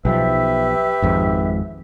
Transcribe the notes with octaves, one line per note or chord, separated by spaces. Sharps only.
B1 E3 F3 G4 B4 E5
G#1 F2 G#2